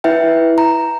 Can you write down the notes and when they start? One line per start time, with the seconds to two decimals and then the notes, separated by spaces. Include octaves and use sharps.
0.04 E4 B4 E5 G5
0.58 A#5